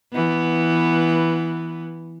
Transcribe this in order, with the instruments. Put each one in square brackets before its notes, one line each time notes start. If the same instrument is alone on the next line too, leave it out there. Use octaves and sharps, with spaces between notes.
[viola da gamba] E3 B3